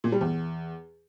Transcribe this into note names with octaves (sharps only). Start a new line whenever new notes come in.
A#2
G3
E2